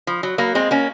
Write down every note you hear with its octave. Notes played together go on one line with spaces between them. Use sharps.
F3
F#3
F#3 A#3
G#3 C4
A#3 C#4